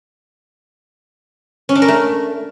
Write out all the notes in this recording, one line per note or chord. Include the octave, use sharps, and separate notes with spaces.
C#4
D4
A#4
A3